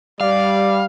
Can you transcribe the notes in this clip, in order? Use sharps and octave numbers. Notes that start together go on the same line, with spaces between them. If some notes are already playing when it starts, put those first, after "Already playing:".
G3 D5 F5